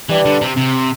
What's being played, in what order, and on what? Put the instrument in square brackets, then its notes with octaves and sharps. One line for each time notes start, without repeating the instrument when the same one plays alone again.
[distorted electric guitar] E3 [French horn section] G3 D4 G4 B4 D5
[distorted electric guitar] D3
C3
C3